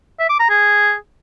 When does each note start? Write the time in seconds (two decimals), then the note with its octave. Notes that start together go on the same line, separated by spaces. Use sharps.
0.19 E5
0.30 D6
0.40 A#5
0.50 G#4